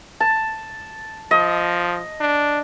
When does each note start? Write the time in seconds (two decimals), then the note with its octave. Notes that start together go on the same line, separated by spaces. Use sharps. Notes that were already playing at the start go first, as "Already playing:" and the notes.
0.20 A5
1.31 F3 D#5
2.21 D4